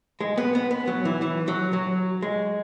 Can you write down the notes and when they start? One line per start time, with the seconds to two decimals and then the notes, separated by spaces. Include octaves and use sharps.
0.21 G#3
0.38 B3
0.55 B3
0.71 B3
0.87 F#3
1.05 E3
1.22 E3
1.48 F#3
1.73 F#3
2.22 G#3